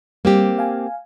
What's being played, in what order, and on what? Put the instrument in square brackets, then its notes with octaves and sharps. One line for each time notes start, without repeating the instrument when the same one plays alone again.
[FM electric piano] G3 [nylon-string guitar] A#3 C4 G4
[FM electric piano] F5 G#5